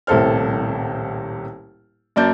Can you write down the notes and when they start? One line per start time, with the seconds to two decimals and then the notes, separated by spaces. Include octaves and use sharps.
0.07 D#1 C2 A2 A4 C5 F6
2.16 F#2 A#3 D5 A5 G6